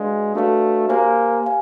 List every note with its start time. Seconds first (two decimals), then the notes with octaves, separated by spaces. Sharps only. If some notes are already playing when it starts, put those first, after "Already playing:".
Already playing: G#3 D4 F#4 B4 D5 F5
0.35 A3 D4 F#4 B4 D5 F5
0.88 A#3 G4 C5 F5 G#5
1.43 G4 C5 F5 G#5